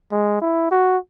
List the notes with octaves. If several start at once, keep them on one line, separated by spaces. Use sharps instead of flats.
G#3
E4
F#4